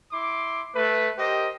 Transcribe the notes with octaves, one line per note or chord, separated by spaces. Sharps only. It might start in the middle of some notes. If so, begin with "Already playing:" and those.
E4 C6 D6
A3 B4
G4 A#4 C5 D#5